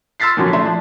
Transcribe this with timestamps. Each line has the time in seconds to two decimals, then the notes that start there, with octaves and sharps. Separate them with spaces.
0.20 C6 E6 F6 A6 B6 C7
0.37 A#2 D3 F3 F#3 C#4
0.53 A3 D4 E5 C6
0.65 F3 D4